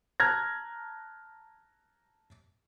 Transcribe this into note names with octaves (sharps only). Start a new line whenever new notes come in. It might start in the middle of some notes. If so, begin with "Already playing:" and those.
A5 A#5 F6 F#6 G#6 A#6